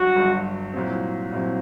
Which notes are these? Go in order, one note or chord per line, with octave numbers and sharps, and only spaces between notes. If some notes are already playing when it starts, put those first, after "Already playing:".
Already playing: G1 G2 F#3 F#4
G1 G2 F#3
C2 A#2 F#3 C4
C2 A#2 F#3 C4